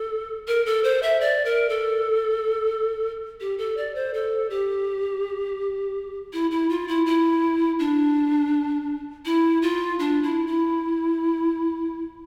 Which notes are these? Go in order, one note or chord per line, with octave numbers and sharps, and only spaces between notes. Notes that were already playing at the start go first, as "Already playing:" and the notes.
Already playing: A4
A#4
A4
C5
E5
D5
A#4
A4
G4
A4
D5
C5
A4
G4
E4
E4
F4
E4
E4
D4
E4
F4
D4
E4
E4